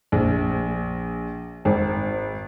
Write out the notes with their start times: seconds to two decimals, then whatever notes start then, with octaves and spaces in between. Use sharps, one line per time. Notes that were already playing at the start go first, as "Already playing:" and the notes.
0.12 A#1
1.65 G#1